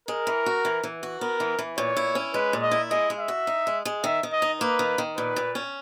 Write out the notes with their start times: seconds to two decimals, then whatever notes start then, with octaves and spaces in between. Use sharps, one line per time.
0.08 G#3 A#4
0.27 E3
0.46 F#4
0.65 E3
0.83 E3
1.03 F#4
1.21 B3 A#4
1.40 E3
1.59 E3
1.78 A#2 C#5
1.97 E4
2.15 C#4
2.34 G#3 B4
2.53 A#2
2.62 D#5
2.71 E4
2.91 G#3 D#5
3.10 G#3
3.20 E5
3.28 F#4
3.47 D#4
3.67 G#3
3.85 G#3
4.04 D#3 E5
4.23 D#3
4.33 D#5
4.42 D#4
4.61 A#3 B4
4.79 D#3
4.98 D#3
5.17 A#2 B4
5.36 A#2
5.55 C#4